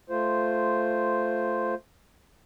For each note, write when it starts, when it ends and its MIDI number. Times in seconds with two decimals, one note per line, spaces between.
0.10 1.74 57
0.10 1.74 65
0.10 1.74 72